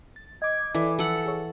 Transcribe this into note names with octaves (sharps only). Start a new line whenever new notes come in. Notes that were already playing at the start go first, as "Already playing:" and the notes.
A6
D#5 D6 G#6
E3 E4 A4 D5 D6
F3 A4 F#5 E6
G#4 C#5